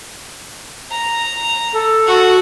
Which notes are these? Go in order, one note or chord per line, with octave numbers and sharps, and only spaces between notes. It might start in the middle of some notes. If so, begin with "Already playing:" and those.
A#5
A4
F#4